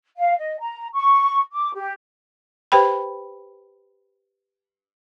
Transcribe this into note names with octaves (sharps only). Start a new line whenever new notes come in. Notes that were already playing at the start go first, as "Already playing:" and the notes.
F5
D#5
A#5
C#6
D6
G4
G4 B4 C5 G5 B5